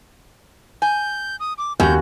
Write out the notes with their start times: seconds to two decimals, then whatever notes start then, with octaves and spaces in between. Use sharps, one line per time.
0.82 G#5 G6
1.40 D#6
1.58 D6
1.80 D#2 C#4 F#4 G6